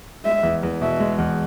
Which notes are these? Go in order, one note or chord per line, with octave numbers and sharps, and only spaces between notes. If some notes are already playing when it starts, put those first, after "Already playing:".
G#3 E5
E2
E2
B2 E5
G#3
E2